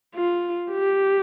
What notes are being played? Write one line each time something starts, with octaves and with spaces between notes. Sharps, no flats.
F4
G4